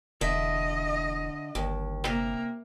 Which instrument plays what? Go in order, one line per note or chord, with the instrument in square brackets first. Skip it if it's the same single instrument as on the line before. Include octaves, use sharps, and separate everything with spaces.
[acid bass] E1 [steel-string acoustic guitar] D3 E5 [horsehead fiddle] D#5
[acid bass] G1 [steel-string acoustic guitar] D#2
[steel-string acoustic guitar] C3 [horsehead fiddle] A#3